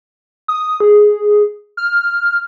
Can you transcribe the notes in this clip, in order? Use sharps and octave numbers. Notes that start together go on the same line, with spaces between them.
D#6
G#4
F6